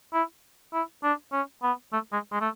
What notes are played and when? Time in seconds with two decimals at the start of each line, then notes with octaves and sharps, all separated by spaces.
0.14 E4
0.73 E4
1.04 D4
1.32 C#4
1.63 B3
1.93 A3
2.12 G#3
2.32 G#3
2.41 A3